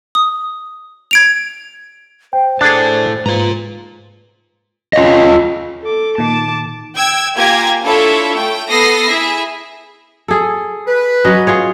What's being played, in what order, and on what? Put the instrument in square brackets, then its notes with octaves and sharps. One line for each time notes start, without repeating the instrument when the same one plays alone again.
[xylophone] D#6
G#6 D7 F7
[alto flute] C5 [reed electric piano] G5
[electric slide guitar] A2 A4 A5 [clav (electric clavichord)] D4 G#4 [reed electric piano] A6
[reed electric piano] G#2 [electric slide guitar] F4 A#5 [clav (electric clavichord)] B4
[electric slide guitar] F4 C#5 D#5
[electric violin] A4 D6
[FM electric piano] A#2 D#3 [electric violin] A5 D6
[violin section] G5 E6 G#6
A#3 F4 G4 G#5 G#6 A#6
D4 E4 F4 A4 C#5 E5
A3 G5
B3 A4 D#6 A#6 C7
E4 G#4 E5
[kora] G#4 A4
[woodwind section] B4
[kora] F#3 C#4 D#5
F4 G#4 C#5